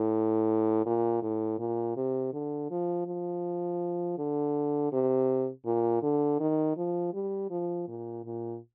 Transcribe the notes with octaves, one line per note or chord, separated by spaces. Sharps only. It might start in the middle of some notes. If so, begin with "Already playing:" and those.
Already playing: A2
A#2
A2
A#2
C3
D3
F3
F3
D3
C3
A#2
D3
D#3
F3
G3
F3
A#2
A#2